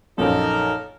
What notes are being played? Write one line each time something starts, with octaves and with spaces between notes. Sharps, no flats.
A#1 F#2 D#4 A4 A#4